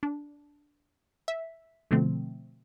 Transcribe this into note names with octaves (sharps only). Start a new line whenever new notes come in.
D4
E5
B2 D3 F3 A3 C4